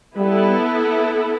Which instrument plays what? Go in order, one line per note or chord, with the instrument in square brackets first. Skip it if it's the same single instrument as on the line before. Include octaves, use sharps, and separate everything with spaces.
[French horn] G3 [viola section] B3 E4 A4